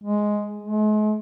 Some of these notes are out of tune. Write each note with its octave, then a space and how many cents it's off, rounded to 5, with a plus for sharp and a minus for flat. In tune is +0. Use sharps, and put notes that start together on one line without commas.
G#3 +5
G#3 +45